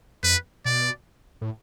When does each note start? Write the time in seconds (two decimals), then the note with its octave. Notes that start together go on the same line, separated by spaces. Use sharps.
0.23 F2 B4
0.65 B2 D5
1.41 A2